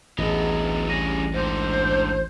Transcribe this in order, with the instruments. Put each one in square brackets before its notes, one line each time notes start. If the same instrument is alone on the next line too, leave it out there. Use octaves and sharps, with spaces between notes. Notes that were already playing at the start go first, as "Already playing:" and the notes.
[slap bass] A1 D2 [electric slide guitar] F#3 A3 B3 [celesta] G#4 D#5 A#6
[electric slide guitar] G3 C#4 G#4 [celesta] A#6 D#7
[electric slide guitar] G#2 D3 [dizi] C5
[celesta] G6